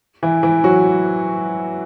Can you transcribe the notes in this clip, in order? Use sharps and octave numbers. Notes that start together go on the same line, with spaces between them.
E3 E4
E3 E4
F#3 F#4